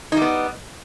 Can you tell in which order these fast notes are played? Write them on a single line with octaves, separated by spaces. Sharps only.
D#4 G3 B3